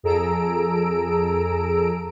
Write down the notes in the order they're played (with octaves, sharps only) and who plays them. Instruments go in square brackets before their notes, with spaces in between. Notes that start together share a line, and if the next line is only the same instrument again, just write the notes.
[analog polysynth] F2 G#4 A4 A#5 E6 D7